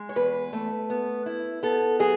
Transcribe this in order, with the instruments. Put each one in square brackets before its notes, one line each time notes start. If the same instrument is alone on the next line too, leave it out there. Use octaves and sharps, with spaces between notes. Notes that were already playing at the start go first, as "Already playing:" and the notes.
Already playing: [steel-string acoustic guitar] G#3
C#5
E2 B4
A3
B3
E4
B3 A4
F#3 G#4